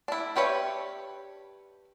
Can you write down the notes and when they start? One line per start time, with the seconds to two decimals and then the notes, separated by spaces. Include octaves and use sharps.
0.08 D4 E4
0.36 D4 G4 B4 C#5 E5